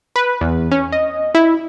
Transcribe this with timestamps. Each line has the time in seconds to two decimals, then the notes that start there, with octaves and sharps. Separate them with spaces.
0.16 B4
0.41 E2
0.71 C#4
0.92 D#5
1.35 E4